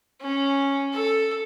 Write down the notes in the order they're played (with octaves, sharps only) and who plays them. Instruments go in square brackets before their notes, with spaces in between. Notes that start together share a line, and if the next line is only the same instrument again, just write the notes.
[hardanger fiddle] C#4
A4